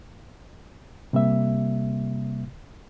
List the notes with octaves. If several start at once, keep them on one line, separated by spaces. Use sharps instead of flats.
C3 G3 A#3 E5